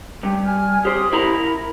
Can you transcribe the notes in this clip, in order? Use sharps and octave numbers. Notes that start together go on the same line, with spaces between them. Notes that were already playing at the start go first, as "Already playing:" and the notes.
G2 G4
G#5 F6
G4 C5 D#6
E4 A#4 A#5 B5